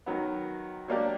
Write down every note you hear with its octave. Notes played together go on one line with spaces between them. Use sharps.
D#3 F#3 B3
F#3 A#3 D4 G4